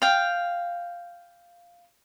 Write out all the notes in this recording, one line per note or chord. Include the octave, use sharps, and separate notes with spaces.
F5 G5